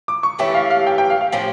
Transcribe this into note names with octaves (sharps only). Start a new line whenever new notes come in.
D6
C#6
E3 A3 C#4 G4 E5
F5
F5
G5
G5
F5
F5
A2 F3 C#4 G4